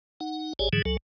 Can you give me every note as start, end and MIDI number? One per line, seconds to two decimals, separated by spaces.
0.20 0.53 63
0.20 0.53 78
0.59 0.69 32
0.59 0.69 67
0.59 0.69 68
0.59 0.69 73
0.59 0.69 74
0.59 0.69 80
0.73 0.82 44
0.73 0.82 50
0.73 0.82 52
0.73 0.82 54
0.73 0.82 68
0.85 0.97 37
0.85 0.97 54
0.85 0.97 69